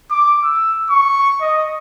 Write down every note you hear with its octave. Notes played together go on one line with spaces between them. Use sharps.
D6
E6
C#6
D#5